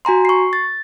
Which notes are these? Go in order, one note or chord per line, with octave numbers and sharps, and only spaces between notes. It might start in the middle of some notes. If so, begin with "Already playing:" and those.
F#4 G#5 A#5 C6
C#6 C7
A6